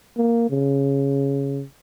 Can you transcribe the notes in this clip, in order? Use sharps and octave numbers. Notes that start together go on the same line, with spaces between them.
A#3
C#3